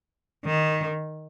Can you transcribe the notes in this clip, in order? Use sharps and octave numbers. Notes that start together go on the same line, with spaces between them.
D#3